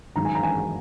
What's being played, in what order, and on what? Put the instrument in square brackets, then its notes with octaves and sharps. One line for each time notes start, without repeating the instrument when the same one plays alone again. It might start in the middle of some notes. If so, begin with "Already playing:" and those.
[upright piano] G#2 D#3 F#3 A#5
G#5
A#5
G#5